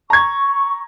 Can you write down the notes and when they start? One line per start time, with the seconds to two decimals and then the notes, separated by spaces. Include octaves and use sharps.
0.10 A#5 C#6 G#6